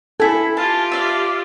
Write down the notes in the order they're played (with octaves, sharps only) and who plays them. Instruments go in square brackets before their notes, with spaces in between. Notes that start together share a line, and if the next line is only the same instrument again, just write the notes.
[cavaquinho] E4 G#5 [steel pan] A4
[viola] F4 G4 [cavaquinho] A5
[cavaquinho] D5 E5